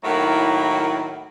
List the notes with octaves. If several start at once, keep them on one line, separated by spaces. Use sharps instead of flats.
A2 D#3 F#3 A#3 E4 F#4